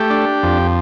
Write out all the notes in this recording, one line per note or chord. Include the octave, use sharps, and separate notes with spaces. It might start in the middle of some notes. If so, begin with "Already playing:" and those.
Already playing: A3 G4
D4
F2